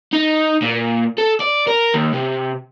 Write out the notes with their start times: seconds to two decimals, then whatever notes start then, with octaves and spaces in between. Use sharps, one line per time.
0.13 D#4
0.62 A#2
1.18 A4
1.40 D5
1.67 A#4
1.94 D#2
2.14 C3